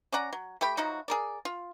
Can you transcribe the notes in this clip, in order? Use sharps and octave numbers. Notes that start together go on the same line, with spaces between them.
C#4 D5 F#5 A#5
F#3
A3 G4 G5 B5
F3 F#3 D#4 F#4
G#4 A#4 D5
F4